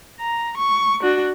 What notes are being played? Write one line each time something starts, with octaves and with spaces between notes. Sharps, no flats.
A#5
C#6
D4 F#4